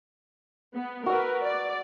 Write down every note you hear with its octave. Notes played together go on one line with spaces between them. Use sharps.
B3
F#4 A#4 B4 E6
D5